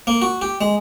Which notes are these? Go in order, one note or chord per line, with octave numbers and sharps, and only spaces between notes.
A#3
F#4
G4
G#3